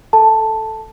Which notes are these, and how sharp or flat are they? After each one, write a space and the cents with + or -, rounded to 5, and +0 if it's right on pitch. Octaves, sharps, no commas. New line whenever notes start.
A4 +0 A5 +0